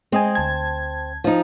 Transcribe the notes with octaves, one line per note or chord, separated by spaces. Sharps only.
G#3 C4 D#5 G#5
D2 A5 G#6
F3 D#4